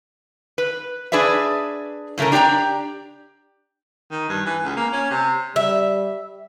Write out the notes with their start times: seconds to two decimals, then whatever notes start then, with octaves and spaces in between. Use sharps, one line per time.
0.58 B4
1.12 D4 G#4 B4 D5 E5
2.18 A2 C#3 A3 C#4 A#4
2.32 D4 G4 D5 G5 A#5
4.11 D#3
4.29 G2
4.45 E3
4.64 C#2
4.76 A#3
4.93 C#4
5.11 C3
5.56 G3 E5